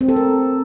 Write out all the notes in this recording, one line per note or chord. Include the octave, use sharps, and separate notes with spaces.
C4
A4
A#4